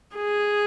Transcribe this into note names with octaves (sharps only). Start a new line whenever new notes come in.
G#4